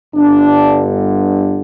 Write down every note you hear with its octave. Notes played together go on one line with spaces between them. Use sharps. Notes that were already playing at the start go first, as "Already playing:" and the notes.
G1 G2 D3 D4